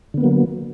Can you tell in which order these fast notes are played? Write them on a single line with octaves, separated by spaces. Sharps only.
D3 B3 A#3 F#3